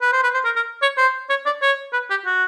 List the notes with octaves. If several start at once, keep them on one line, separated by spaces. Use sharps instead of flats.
B4
C5
B4
C5
A#4
A#4
C#5
C5
C#5
D5
C#5
B4
G4
F#4